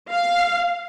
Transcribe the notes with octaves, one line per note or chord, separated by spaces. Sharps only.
F5